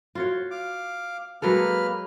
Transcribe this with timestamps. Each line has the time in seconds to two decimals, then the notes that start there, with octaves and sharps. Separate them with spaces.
0.15 F4 F#4 C#5
0.51 F5 D6
1.42 F#3 G#3 A#3 A4 B4 F6